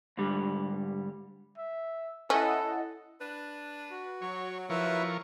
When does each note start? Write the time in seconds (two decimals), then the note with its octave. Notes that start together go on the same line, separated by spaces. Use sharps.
0.18 G#2 D3 G3
1.58 E5
2.30 C#4 E4 A4 D#5 F#5
3.21 D4 B4
3.91 F#4
4.22 F#3 C#5
4.70 F3 E4 A#4 B4 E5 C#6